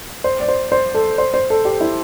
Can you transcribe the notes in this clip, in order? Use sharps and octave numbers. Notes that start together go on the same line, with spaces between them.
C5
D5
C5
C5
A4
C5
C5
A4
G4
E4